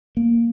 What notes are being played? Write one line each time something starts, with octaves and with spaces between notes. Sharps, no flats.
A#3